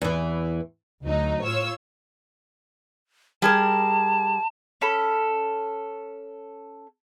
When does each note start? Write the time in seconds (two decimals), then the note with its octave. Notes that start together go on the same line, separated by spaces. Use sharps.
0.02 E2 E3
1.04 D2 F#3 D#4
1.44 A2 F4 C#5 E6
3.42 G3 G#4 A#4 A5
4.81 C#4 A4 B5